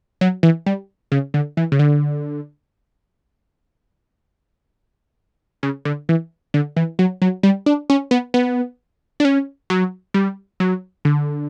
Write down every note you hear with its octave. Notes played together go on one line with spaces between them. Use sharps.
F#3
E3
G3
C#3
D3
E3
C#3
D3
C#3
D3
E3
D3
E3
F#3
F#3
G3
D4
C#4
B3
B3
D4
C#4
F#3
G3
F#3
D3